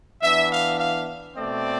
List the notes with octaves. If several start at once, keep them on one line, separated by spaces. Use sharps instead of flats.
E3 B3 D4 E5
F5
F5
B2 A3 C4 D5